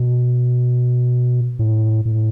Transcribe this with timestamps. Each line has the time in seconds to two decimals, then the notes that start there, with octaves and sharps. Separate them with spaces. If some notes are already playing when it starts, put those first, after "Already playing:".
Already playing: B2
1.59 A2
2.05 A2